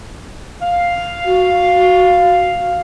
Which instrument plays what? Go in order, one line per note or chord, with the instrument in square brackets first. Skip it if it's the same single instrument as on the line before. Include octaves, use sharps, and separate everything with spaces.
[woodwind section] F5
[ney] F#4